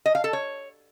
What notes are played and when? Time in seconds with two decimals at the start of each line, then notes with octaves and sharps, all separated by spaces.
0.06 D#5
0.15 F5
0.24 A4
0.33 C#5